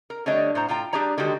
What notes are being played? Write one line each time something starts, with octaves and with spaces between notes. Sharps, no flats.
A#4
D3 G3 A3 D4 C#5 D#5
A2 C5 A#5
A2 F4 G5 A#5
G3 D4 G4 G#4 C#5 A#5
D3 D#3 G3 G#3 F#4 G4